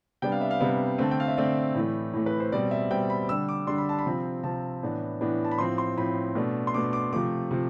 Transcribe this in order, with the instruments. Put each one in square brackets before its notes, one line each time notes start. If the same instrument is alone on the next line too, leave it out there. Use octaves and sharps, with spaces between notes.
[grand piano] C3 G3 B3 D4 G5
F5
E5
F5
C3 G3 B3 D4 E5
D3 A3 C4 A5
G5
F5
E5
D3 A3 C4 D5
A2 E3 A3
A2 E3 A3
B4
C5
B2 G3 C4 D5
E5
B2 G3 C4 G5
B5
D3 G3 D4 E6
D6
D3 G3 D4 C6
B5
A5
B5
C3 F3 C4
C3 F3 C4 A5
A2 E3 B3 D4
A2 E3 B3 D4
A5
B5
A2 F3 C4 C6
C6
A2 F3 C4 B5
B2 A3 D4
C6
B2 A3 D4 D6
D6
C3 F3 A3 D6
C3 F3